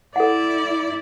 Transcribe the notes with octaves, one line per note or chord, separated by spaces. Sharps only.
E4 A4 D5 F#5